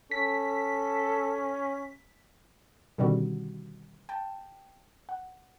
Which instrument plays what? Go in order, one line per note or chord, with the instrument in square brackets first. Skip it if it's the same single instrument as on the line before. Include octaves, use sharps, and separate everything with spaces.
[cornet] C#4 [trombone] A4 [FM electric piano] B6
[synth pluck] B2 D3 D#3 G3 C4 F#4
G5 A5
F#5